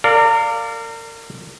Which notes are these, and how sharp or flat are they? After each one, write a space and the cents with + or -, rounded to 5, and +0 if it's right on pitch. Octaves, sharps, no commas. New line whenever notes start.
A#4 -35 D5 +0 F5 +0